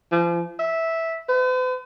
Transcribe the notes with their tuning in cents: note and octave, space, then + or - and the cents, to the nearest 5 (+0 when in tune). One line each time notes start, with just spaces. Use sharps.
F3 -35
E5 -10
B4 +45